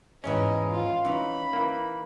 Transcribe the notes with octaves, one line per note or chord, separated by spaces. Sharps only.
E2 G#2 E3 C#4 B4 D#5
F4
E3 C#4 D#4 B5
E3 A#3